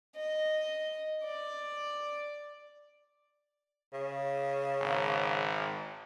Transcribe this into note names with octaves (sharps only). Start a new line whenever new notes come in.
D#5
D5
C#3
G#1